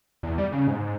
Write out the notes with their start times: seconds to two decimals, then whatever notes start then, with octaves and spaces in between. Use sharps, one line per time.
0.23 E2
0.38 G3
0.52 C#3
0.67 G#2